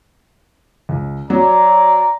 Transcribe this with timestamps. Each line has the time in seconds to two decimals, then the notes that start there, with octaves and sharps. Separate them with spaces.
0.89 C#2
1.30 F#3 D5 A#5